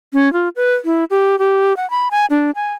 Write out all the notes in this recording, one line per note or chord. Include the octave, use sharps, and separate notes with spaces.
C#4
F4
B4
E4
G4
G4
F#5
B5
G#5
D4
G#5